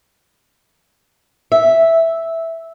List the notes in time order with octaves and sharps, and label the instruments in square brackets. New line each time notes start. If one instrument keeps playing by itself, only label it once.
[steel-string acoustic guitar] E5